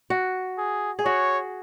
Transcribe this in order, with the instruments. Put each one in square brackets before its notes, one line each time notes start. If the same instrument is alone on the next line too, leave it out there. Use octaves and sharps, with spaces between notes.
[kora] F#4
[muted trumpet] G#4
[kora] G#4
[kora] F#4 [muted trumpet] C#5